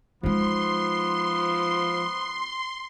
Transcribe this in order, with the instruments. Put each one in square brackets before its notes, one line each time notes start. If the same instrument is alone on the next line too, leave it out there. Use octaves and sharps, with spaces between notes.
[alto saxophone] F3 [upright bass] G#3 D#4 [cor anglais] B3 [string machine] C6